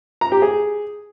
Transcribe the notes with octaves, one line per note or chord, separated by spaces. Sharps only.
A#5
G4
G#4